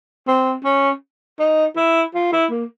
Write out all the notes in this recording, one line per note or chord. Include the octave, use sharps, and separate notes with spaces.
C4
C#4
D#4
E4
F4
E4
A#3